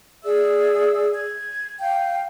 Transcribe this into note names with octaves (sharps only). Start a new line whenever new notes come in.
G#4 D5 E5 E6
G#6
F5 G5